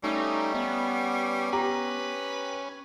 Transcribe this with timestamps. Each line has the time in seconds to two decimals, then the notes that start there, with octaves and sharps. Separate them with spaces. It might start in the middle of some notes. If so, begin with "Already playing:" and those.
0.04 G3 A3 C#4 D#4
0.54 B3 C#4
1.53 G4 B4 A#5